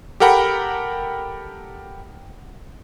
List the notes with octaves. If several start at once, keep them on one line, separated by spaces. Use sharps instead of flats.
G4 A4 A#4 F#5 G5 B5